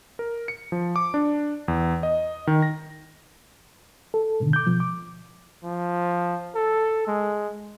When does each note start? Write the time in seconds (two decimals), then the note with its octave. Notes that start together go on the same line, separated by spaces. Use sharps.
0.19 A#4
0.48 C#7
0.72 F3
0.96 D6
1.14 D4
1.68 E2
2.03 D#5
2.47 D#3
2.62 A#6
4.14 A4
4.40 G#2 B2 D3 D#3
4.53 D6 G6
4.67 B2 F3
4.80 D6
5.64 F3
6.55 A4
7.08 G#3